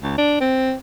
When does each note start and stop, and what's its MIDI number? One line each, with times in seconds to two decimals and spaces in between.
0.02 0.15 37
0.18 0.36 62
0.41 0.74 60